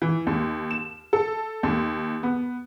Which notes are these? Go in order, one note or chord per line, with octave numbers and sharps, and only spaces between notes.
E3
D#2
E7
A4
D#2
B3